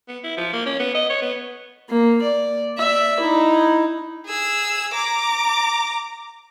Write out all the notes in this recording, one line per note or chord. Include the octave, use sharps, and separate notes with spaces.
B3
E4
F3
A#3
C#4
B3
D#5
C#5
B3
A#3
D5
D5 E5
D#4 E4
G#4 E6
A#5 D6